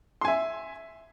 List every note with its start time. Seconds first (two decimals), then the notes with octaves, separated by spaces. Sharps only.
0.21 C6
0.25 G#5
0.28 E5